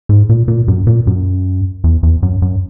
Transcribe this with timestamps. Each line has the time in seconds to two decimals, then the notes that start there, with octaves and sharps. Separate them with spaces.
0.09 G#2
0.29 A#2
0.48 A#2
0.68 F#2
0.87 A#2
1.07 F#2
1.84 E2
2.03 E2
2.23 F#2
2.42 F#2